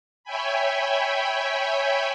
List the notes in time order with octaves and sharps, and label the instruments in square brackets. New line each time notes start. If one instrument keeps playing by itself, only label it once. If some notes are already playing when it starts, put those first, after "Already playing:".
[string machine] C#5 E5 G5 G#5 B5